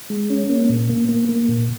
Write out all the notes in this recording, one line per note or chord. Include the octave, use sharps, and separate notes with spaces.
G#3
C#4
A#3
A#2
A#3
A#3
A#3
A#2